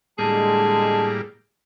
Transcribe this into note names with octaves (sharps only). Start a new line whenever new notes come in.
A2 D3 G3 G#3 A#3 G#4 A5